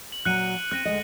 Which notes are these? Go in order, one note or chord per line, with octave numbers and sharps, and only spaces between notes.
F#7
A#2 F#3 F#6 C#7 D#7
C4 F#6 A#6 D#7
D2 G#3 D#5